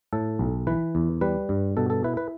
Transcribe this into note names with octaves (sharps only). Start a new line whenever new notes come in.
A2 A4
B1
E3 B4
E2
G3 B4
G2
B2 A4
A4
E4 B4
B4